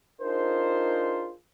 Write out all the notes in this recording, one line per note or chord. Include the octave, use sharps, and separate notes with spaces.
D4 D#4 F4 G#4 A#4 C5